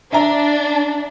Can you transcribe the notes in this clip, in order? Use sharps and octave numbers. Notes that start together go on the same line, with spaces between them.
D4 E5 A#5